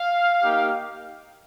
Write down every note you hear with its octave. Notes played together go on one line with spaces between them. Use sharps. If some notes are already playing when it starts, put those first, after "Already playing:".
Already playing: F5
A#3 D#4 G4